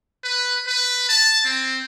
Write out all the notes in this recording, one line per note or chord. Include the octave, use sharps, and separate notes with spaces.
B4
B4
A5
C4